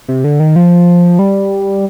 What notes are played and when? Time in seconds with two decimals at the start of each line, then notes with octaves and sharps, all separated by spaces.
0.08 C3
0.24 D3
0.40 D#3
0.56 F3
1.19 G3